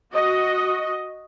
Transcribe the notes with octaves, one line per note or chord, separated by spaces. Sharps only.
F#4 D#5